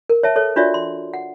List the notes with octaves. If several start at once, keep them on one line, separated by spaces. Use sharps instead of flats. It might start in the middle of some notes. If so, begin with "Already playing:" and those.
A#4
C#5 E5 A5
A4 C#5
D4 F4 F#4 C#5 D5 E5
C6
F#5